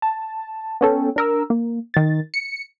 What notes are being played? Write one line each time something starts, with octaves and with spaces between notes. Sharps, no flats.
A5
B3 C#4 A4 G5
D4 A#4 E6
A#3
D#3 A6
C#7